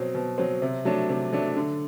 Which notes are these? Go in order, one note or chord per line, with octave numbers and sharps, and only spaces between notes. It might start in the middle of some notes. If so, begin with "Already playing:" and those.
Already playing: B2 F#3 C4
B2
F#3 C4
C3
F#3 A3 D4
C3
F#3 A3 D4
D3